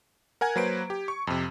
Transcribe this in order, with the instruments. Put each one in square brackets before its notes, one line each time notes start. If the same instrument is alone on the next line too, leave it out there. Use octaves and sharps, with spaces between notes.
[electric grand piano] A#4 F#5 G#5 G#6
F#3 A#3 B4 C5 D7
G4
C#6
F2 C3